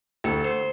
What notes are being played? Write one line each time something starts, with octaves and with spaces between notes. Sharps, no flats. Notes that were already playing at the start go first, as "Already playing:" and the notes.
D2 A4
C5